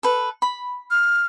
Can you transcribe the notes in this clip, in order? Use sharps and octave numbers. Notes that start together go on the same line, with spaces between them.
A4 B4
B5
F6